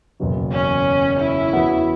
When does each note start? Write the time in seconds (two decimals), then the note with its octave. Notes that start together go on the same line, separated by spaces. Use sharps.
0.20 F#1 E2 B2 F#3
0.52 C#4
1.20 E4
1.53 E2 E3 B3 F#4